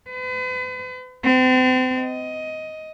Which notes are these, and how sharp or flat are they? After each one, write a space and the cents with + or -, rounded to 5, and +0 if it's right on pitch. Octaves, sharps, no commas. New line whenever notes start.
B4 +40
C4 -35
D#5 +10